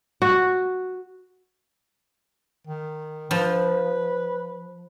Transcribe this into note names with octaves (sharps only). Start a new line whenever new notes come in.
F#4
D#3
F3 B4